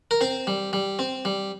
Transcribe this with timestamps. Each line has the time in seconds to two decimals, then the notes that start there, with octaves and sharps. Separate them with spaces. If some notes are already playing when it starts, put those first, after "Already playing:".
0.11 A#4
0.21 C4 C5
0.47 G3
0.73 G3
0.99 C4
1.25 G3